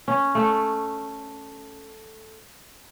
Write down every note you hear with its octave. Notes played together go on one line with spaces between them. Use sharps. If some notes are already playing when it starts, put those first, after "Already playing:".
C#4
A3